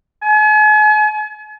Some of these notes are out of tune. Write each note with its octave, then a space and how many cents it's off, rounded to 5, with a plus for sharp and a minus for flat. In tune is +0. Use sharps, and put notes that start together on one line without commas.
G#5 +45